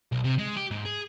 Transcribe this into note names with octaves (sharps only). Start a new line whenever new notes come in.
B1
C3
G#3
G4
G#2
G#4